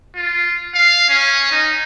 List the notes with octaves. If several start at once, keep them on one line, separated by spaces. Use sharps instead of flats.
F4
F5
C#4
D#4